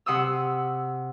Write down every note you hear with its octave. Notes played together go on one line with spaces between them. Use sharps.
C3 F#5 C6 D#6 E6